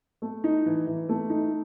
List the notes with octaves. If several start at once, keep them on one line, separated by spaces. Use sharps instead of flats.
A3
D#4
E3
E3
A3
D#4